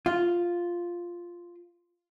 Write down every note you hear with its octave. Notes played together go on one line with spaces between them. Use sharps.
F4